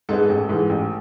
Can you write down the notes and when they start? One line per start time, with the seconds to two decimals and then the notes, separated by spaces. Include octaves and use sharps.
0.09 G#2 G#3 B3 A4
0.29 A1
0.49 G#2 E3
0.69 A1